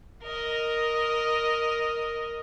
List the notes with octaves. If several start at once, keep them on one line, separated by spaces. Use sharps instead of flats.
A#4 D#5